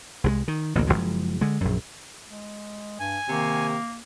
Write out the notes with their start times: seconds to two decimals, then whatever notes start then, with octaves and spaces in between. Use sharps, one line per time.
0.24 C2 F3 G#3
0.48 D#3
0.75 A1 D2 A#2 A#3
0.87 F#1 D2 F3 G#3
1.41 D3 G#3
1.61 A#1 F#2
2.28 G#3
2.99 G2 G#5
3.29 C3 D#3 A#3